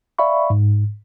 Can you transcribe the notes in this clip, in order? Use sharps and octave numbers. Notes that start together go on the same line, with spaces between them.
D5 E5 F5 B5 C#6
G#2